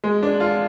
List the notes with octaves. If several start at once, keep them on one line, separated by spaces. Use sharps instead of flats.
G#3
D4
F4